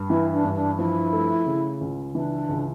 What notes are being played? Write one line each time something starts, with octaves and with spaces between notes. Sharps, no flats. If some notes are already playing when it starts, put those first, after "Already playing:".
Already playing: G2
E3 E4
D4
G2
D4
F3 E4
A3
C#3
C#2
E3 D4
C#2